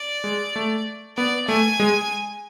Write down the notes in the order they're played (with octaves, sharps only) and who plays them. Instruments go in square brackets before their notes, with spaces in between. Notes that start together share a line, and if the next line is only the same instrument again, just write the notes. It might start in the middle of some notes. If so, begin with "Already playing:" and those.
Already playing: [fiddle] D5
[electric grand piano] G#3
A3
[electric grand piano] B3 [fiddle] D5
[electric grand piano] A3 [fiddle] G#5
[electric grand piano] G#3